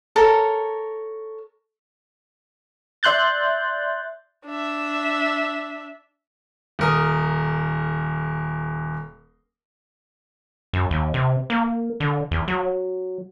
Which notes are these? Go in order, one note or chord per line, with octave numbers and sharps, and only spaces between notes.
A4 A#4 C#5
D5 E5 C6 F#6 G6 A6
D4 E5
D#1 A#4 D#6
F#2
D#2
C3
A#3
D3
E2
F#3